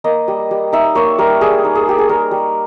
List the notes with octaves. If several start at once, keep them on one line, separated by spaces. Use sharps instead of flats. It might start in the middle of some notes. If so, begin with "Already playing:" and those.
A#3 D#5
G3
G3
D#4 E5
A#3 C#5
G3 A#4
G3 G#4
D#4
G#4
A#3 G4
G#4
G3 A#4
G3